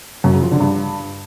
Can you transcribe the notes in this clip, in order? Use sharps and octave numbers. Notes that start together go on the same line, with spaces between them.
F#2
C#3
F3
D3
G2